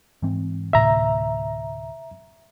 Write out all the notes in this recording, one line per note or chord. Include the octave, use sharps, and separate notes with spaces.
G#2 E3 C4
D2 A2 C3 E5 A#5